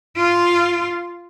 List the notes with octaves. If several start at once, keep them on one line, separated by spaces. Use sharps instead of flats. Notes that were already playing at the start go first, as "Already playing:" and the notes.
F4